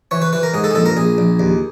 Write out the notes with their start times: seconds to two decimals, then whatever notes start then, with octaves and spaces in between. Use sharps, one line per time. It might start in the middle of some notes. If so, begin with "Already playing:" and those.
0.11 E3 C#5
0.22 B4
0.33 E3 B4
0.43 A#4
0.54 G#2 G#4
0.64 A4
0.71 G#4
0.75 A#1 A4
0.86 A#4
0.97 A#1 G#4
1.18 A#1
1.40 D#2